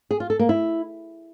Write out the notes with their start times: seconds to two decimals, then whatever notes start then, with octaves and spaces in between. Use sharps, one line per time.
0.11 G#4
0.20 F4
0.30 A4
0.39 A#3
0.49 E4